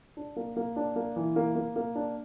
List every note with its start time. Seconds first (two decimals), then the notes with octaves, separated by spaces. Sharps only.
0.17 D4
0.36 A#3
0.56 A#3
0.76 D4
0.96 A#3
1.16 E3
1.36 A#3
1.56 A#3
1.76 A#3
1.95 D4